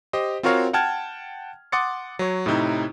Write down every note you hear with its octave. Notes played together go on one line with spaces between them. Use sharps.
G4 C5 D#5
C4 F4 F#4 A#4 C#5 F5
F#5 G5 A5 F6 G#6
F#5 C6 D6 D#6 A6 C#7
F#3 C#5
A2 C3 D#4 E4